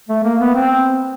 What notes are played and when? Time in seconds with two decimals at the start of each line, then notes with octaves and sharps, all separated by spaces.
0.09 A3
0.24 A#3
0.40 B3
0.55 C4